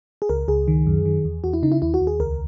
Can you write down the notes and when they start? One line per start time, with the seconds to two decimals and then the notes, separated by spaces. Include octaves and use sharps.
0.22 G#4
0.29 C#2 A#4
0.48 C#2 G#4
0.68 D#3
0.86 F#2
1.05 D#3
1.25 E2
1.44 E2 F#4
1.53 E4
1.62 C#3 D#4
1.72 E4
1.82 D#2 E4
1.94 F#4
2.01 D#2
2.07 G#4
2.20 C#2 A#4